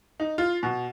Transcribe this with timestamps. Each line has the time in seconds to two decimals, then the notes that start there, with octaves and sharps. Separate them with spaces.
0.20 D#4
0.38 F4
0.63 B2